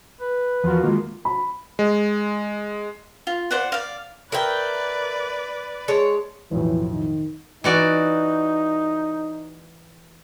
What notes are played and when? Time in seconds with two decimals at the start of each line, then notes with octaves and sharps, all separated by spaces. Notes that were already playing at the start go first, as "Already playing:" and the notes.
0.21 B4
0.64 E2 F3 F4 F#4 A#4
0.83 D#3 G#3 A#3
1.25 B5
1.79 G#3
3.27 F4
3.51 C5 D5 F#5
3.72 D5 F5
4.32 A#4 B4 D5 E5 G5
5.88 G#3 C#5 A5
6.51 B1 F2 A2 E3
6.91 D#3
7.64 E3 D#4 F#4 D5